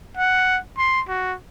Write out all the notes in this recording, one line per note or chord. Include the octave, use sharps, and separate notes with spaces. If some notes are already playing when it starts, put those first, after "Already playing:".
F#5
C6
F#4